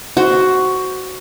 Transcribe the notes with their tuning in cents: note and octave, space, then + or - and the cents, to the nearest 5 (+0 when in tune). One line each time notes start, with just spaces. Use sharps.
F#4 +10 C5 +0